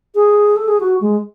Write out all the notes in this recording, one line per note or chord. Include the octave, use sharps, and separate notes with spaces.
G#4
A4
G#4
F#4
G#3